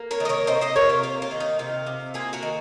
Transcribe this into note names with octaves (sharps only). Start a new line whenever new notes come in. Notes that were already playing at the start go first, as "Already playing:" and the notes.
Already playing: A#3
A#4 C#5
D#3 D#5
A#4 C#5
C3 C5 D#5
C5 D#5
C3 A#4 C#5
F4
A#3 F4
F4
D#3
D#4
C3 F4
C3
A#3 F4 G#4
F#4 A#4
D#3